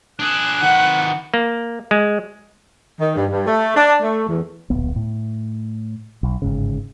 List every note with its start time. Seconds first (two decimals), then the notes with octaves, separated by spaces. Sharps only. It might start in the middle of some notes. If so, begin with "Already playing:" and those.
0.19 D4 G#4 F#6
0.62 D#3 B4 F#5
1.34 A#3
1.91 G#3
2.99 D#3
3.15 G2
3.31 G2
3.46 A3
3.75 D4
4.01 A3
4.27 E2
4.70 D1 A#1 B3
4.96 A2
6.23 B1
6.42 G1 G#2 C#3